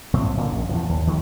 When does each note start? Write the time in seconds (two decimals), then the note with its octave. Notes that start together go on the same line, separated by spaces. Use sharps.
0.13 C2 A2 F#3 C4
0.37 A#2 D3 A#3
0.51 A#1 F#2
0.69 E2 A2 F3
0.89 D#2
1.07 D#3 F3 G#3